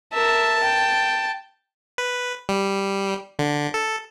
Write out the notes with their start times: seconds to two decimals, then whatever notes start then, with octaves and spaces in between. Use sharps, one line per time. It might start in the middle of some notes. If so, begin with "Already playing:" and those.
0.13 A#4 E5 A5
0.63 G5
1.98 B4
2.49 G3
3.39 D3
3.74 A4